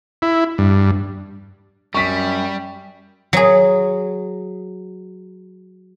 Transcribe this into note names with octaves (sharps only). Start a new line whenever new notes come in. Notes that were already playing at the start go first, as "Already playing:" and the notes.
E4
G2
F#2 G3 C#6 B6
F#3 G#4